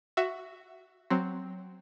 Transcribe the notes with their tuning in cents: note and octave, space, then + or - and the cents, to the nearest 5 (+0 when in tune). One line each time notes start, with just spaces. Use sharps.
F#4 +5 E5 +15
F#3 +5 C4 +0